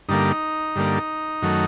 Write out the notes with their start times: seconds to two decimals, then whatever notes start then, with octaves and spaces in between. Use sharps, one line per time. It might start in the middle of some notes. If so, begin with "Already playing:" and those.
0.09 G2 D3 G3 A#3 D#4
0.76 G2 D3 G3 A#3
1.42 F#2 D#3 F#3 A3